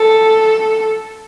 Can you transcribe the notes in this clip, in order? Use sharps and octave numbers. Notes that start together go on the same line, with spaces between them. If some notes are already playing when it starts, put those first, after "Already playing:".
Already playing: A4